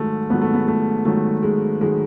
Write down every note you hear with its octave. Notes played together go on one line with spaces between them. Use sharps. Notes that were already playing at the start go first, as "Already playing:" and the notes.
Already playing: G#2 D#3 F#3 G#3 A3
G#2 D#3 F#3 B3
A3
B3
A3
G#2 D#3 F#3 A3
G#3
G#2 D#3 F#3 G#3